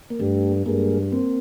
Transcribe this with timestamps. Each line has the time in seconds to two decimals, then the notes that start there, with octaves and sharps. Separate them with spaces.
0.10 A#3
0.20 G2 G3 A3
0.66 G2 G#3 A#3
1.12 A#3 C4